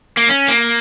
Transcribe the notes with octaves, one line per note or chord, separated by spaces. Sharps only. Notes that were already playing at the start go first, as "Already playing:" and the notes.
A#3
C#4
A#3